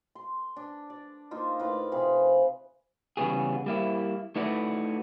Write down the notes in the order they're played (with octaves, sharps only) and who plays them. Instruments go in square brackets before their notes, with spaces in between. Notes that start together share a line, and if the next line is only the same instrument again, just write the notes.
[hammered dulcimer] C6
D4
D5
A#3 D#4 F4 C5
A2 B4 F5 D6
C3 F3 G#4 B4
[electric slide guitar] C#3 E3 G3 B3 F#4 G#4
G3 A#3 E4
A3 D#4 E4 F#4 B4 D5